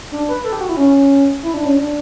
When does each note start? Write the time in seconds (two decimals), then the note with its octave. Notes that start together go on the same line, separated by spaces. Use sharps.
0.12 D4
0.29 B4
0.44 A4
0.53 G4
0.60 F#4
0.69 E4
0.77 C#4
1.43 E4
1.54 D4
1.65 C#4
1.76 D4